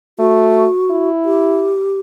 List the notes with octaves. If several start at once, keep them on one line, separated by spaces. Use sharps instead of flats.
A3 F#4
E4
G4